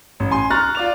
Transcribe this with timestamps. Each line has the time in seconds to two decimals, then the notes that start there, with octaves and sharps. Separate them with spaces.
0.20 A1
0.31 G#5 C6
0.50 A#5 C#6 F6 F#6 A6
0.75 F4 D5 F7